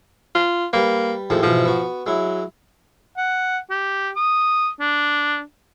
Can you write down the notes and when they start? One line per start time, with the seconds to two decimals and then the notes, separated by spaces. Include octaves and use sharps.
0.35 F4
0.73 G3 A#3 B4
1.30 D#2 A2 F3 G#3
1.43 G#2 B2 E3 F3
1.65 B3 F#4
2.07 F#3 G#3 E4
3.17 F#5
3.70 G4
4.16 D#6
4.80 D4